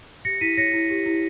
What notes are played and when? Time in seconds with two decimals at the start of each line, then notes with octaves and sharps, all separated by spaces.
0.25 G4 A#6 C#7
0.41 E4 B6 D#7
0.57 C#5 A#6 C#7
0.74 E4
0.90 G4
1.06 E4